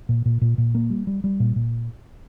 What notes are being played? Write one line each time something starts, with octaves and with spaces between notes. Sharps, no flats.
A#2
A#2
A#2
A#2
A#3
G3
G3
G3
A#2
A#2